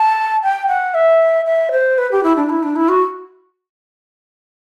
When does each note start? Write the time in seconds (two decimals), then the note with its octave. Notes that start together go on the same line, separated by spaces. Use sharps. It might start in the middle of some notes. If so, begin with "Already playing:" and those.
Already playing: A5
0.43 G5
0.67 F#5
0.94 E5
1.46 E5
1.71 C5
1.98 B4
2.11 G4
2.23 E4
2.36 D4
2.49 E4
2.63 D4
2.75 E4
2.88 F#4